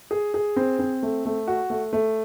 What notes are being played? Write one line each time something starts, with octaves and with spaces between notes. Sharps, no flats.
G#4
G#4
C4
C4
A3
A3
F#4
A3
A3